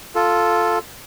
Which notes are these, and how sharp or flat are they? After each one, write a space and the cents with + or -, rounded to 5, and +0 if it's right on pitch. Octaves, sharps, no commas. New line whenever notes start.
F4 +0 A4 +0